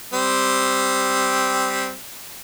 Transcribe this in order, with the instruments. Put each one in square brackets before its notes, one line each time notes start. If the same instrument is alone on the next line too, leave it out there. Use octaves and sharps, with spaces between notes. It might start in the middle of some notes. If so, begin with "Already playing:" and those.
[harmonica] G3 C4